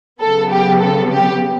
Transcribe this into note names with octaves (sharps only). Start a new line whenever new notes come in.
C#3 F#3 B3 A4
G4
A4
G4